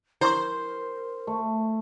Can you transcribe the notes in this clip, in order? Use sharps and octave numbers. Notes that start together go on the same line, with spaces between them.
E4 A#4 C5 C6 C#6
A3